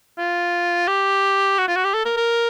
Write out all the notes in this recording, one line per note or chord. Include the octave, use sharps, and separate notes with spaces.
F4
G4
F#4
F4
F#4
G4
A4
A#4
A#4